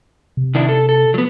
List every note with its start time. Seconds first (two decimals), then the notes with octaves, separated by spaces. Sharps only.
0.37 C3
0.55 D#3 D4 E4
0.69 A4
0.89 A4
1.14 F#3 B3